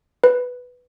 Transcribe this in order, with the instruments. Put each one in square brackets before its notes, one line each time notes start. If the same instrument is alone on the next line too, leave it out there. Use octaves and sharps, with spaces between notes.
[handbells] B4